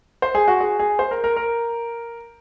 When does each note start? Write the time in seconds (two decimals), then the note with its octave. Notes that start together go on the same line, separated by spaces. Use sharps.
0.22 C5
0.35 G#4
0.48 F#4
0.60 G#4
0.79 G#4
0.99 C5
1.11 A#4
1.24 A#4
1.36 A#4